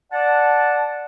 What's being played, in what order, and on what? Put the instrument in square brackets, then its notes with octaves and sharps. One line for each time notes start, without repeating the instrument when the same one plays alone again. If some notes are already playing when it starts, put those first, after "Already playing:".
[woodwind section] D5 F#5 A5